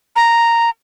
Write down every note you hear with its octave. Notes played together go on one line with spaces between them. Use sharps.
A#5